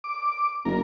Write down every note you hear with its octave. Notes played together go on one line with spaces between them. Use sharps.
D6
F#1 A#4